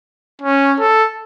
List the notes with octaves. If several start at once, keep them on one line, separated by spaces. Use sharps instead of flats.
C#4
A4